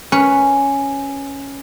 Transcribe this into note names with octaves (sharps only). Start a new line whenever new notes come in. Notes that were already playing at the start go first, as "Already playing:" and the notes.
C#4 B4